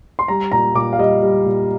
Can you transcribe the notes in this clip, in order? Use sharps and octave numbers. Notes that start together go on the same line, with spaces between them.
C6
G3 A#5
A#2 A#5
A#2 D6
F5
G3 D#5
G3
A#2